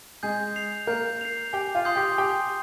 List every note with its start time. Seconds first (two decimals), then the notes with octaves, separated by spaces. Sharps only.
0.23 G#3 G#4 G6
0.56 C7 F7
0.87 A#3 A#4 G6
1.21 C7 F7
1.53 G4 G5 G#5
1.75 F4 F5
1.85 C6 D#6 G6 C7
1.96 G4 G5
2.18 G4 G5 G#5